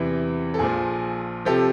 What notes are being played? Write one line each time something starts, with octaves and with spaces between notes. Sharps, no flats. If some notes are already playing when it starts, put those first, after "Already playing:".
Already playing: E2 C3 E3
A4
A#1 A#2 F3 G#4
C3 F3 G4 A4